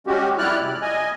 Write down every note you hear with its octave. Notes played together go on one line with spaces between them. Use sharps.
G3 G#3 C#4 F#4 G4
F2 G3 E4 D5 F6 F#6
C3
D#5 G#5